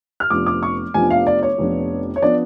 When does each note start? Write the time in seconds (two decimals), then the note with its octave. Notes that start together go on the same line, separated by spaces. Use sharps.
0.20 F6
0.30 F1 F2 F3 B3 D4 D6
0.46 D6
0.63 C#6
0.94 F1 F2 F3 B3 D4 G#5
1.10 F5
1.27 D5
1.43 C#5
1.58 F1 F2 F3 B3 D4
2.16 C#5
2.22 F3 B3 D4 D5